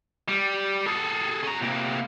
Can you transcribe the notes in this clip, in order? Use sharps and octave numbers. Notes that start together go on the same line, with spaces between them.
G3
G#4 A4
C#4 A#5
C3 A#3